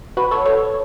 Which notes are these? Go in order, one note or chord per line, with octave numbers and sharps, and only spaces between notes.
F#4 B4
A4 C#5
A4 C#5